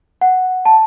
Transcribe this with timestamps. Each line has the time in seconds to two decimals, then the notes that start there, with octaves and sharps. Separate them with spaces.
0.21 F#5
0.65 A5